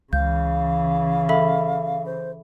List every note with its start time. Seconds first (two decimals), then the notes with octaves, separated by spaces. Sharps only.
0.13 C#2 C#3 E3 F5 G6
1.29 A4 E5 B5
2.06 C5